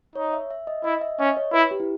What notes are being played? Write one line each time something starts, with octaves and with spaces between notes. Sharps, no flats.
D#4 C#5
E5
E5
D#5
E4 D#5
E5
C#4 D#5
C#5
E4 B4
G4
E4